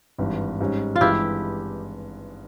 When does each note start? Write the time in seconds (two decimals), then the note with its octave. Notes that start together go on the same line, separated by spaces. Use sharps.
0.18 G#1 G2 E3
0.61 G#2 G3 C#4
0.96 F4
1.01 G#1 G2 E3 G#3 E4 G4